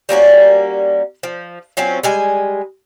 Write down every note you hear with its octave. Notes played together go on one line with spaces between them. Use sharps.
G3 A#3 C#4 F#4
F3
F#3 C4 C#4 F4
G3 G#3 G#5